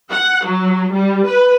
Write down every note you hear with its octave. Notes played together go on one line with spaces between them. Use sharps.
F#5
F#3
G3
B4